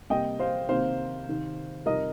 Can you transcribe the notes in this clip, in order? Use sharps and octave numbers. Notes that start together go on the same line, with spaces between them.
C3 G3 A#3 D#5 G5
C5 F5
C3 D#3 A#3 C5 F5
C3 D#3 C4
F2 C3 D#3 G3 A#4 D#5